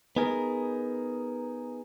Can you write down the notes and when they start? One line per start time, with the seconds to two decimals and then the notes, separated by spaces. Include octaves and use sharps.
0.16 B3 D#4 G#4 A#4